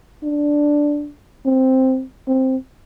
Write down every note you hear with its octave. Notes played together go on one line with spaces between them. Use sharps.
D4
C4
C4